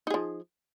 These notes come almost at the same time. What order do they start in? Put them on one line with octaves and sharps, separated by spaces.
D#4 G#4 F3